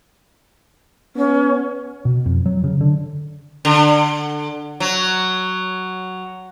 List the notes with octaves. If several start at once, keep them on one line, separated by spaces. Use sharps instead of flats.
B3 C#4
B2
F2
F#3
C#3
D3
D3
F#3